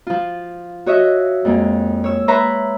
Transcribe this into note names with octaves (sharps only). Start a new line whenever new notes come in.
F3 F4
F#4 C#5 D#5 E5
F2 G#3 A#3
C#5 E6
B4 C#5 E5 A#5 C6